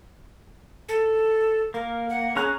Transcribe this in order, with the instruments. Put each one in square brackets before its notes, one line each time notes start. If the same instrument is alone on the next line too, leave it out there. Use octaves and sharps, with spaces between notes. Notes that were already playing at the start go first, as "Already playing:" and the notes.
[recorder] A4
[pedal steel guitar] A#3 [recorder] A#4
[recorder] F#5
[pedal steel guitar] C#4 A#5 F#6 [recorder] G#4